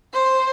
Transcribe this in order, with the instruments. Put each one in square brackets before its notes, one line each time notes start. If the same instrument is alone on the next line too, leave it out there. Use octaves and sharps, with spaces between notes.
[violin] C5